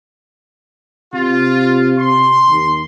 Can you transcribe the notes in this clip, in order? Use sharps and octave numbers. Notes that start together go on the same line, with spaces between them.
C3 F4
C6
D#2